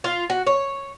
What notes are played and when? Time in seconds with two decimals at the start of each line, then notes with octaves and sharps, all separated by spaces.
0.04 F4
0.30 F#4
0.47 C#5